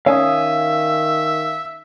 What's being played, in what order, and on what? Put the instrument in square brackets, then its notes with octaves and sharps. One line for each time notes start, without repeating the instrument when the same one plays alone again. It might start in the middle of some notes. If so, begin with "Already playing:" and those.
[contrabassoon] D#3 [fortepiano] C#4 [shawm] E5 [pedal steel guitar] F5 G#5 D#6